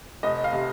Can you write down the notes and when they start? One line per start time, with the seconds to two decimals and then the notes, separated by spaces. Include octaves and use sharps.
0.23 F1 D#5
0.44 F5
0.53 C3